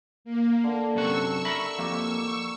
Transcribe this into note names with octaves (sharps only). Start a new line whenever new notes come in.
A#3
D3
F#2 C3 F#4 C#6 E6
A#4 E5 B5
F2 A#3 G4